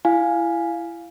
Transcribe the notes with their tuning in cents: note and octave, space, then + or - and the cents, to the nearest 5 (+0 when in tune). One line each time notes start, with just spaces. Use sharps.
E4 +30 F5 +0 G#5 +0